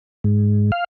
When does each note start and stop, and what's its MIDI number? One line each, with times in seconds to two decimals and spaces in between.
0.24 0.71 44
0.72 0.84 77